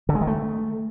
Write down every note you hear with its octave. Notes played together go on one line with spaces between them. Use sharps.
D3
G#3
D#3
A3